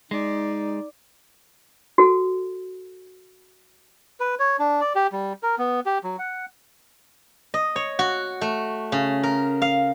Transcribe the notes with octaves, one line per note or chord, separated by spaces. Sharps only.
G#3 D#4 D5
F#4 A4
B4
C#5
D4
D5
G4
G3
A#4
B3
G4
F#3
F#5
D#5
C#5
F#4
A3
C#3
A#4
F5